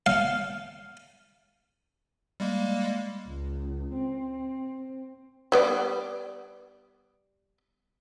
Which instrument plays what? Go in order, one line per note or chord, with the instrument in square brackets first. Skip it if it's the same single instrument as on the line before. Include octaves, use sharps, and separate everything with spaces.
[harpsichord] F5
[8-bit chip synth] G3 G#3 A#3
[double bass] C#2
C4
[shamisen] G3 B3 D5